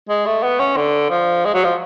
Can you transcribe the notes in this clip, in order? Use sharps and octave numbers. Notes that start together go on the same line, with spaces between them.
G#3
A3
B3
C#4
D3
F3
G#3
F#3
F3